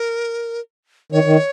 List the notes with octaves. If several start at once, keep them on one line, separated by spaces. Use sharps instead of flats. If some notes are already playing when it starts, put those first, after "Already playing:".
Already playing: A#4
D#3 C#5
D#3